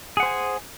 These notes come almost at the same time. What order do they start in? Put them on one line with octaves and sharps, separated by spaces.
G#4 F#5 C5 G#5